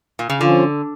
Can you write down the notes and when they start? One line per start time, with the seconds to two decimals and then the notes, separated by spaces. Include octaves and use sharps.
0.19 A#2
0.30 C#3
0.40 D3 F3 C#4 F4